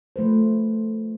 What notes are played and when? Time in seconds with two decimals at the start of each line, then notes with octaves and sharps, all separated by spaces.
0.16 F3 A3 B4 C5